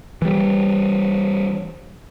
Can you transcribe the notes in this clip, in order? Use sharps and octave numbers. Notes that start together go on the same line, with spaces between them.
E3 G3